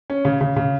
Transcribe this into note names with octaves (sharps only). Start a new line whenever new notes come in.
C#4
C#3
C#3
C#3